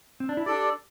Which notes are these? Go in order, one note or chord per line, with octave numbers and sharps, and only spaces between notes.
C4
D4
E4
D4 G4 A4 D5